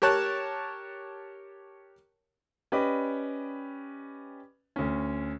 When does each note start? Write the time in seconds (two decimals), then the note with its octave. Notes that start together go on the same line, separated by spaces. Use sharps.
0.02 G4 A#4 C#5 A5 F#6
2.72 C#4 G4 B4 D5 D#5 B5
4.76 D2 C#4